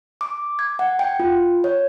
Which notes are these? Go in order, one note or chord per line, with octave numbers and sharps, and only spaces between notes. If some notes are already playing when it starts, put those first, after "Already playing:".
D6
G#6
F#5
G5
F4
C#5